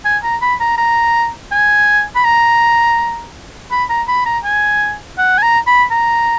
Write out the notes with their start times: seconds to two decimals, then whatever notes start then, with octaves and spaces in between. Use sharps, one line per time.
0.05 G#5
0.23 A#5
0.42 B5
0.60 A#5
0.78 A#5
1.52 G#5
2.15 B5
2.24 A#5
3.71 B5
3.89 A#5
4.08 B5
4.26 A#5
4.44 G#5
5.18 F#5
5.38 G#5
5.42 A#5
5.67 B5
5.91 A#5